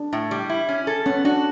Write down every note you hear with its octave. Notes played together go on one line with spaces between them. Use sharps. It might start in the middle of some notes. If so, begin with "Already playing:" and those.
Already playing: D4
A2
G3
E4
C#4
A4
B3 C#4
D4 F#4